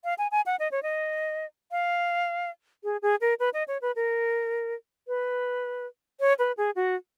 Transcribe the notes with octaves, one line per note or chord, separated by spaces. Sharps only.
F5
G#5
G#5
F#5
D#5
C#5
D#5
F5
G#4
G#4
A#4
B4
D#5
C#5
B4
A#4
B4
C#5
B4
G#4
F#4